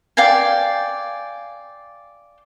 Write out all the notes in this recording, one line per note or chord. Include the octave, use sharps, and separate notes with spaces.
D5 F5 G5 G#5